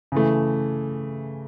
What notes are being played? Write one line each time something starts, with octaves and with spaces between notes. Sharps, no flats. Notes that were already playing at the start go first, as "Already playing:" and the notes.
C#3 E3 A3